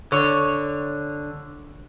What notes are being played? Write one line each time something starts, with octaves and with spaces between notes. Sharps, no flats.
D3 C#5